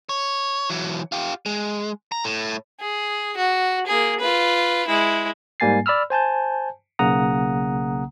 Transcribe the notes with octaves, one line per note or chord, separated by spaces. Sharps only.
C#5
E3 F#3
F4 G4
G#3
A#5
A2
G#4
F#4
A#3 G#4
F4 B4
G#3 E4
G#2 G3 A#3 G#5 A6 C7
D5 B5 E6 F6
C5 G#5 A5 G6
B1 C#3 A#3 F#5 A#5 D#6